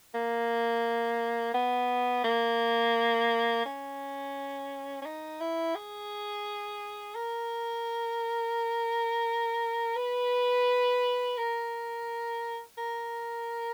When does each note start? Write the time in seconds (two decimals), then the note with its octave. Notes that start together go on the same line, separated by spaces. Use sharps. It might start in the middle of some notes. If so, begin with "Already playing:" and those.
0.14 A#3
1.54 B3
2.24 A#3
3.65 C#4
5.02 C#4
5.06 D#4
5.40 E4
5.75 G#4
7.15 A#4
9.96 B4
11.37 A#4
12.78 A#4